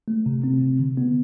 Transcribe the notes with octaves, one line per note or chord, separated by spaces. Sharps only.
A3
C3
C4
C3
D3
B3